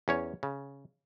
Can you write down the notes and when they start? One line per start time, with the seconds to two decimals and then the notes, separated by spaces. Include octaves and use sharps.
0.08 E2 C#4 C#5
0.43 C#3